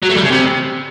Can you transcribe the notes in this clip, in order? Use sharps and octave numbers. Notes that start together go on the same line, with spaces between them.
F#3
A3
G3
C#3
C3